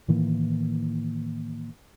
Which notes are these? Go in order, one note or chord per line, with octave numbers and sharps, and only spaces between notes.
A2 D#3 E3 A#3